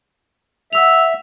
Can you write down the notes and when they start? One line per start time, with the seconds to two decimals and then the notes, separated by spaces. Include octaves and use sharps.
0.73 E5 F#5 E6 F7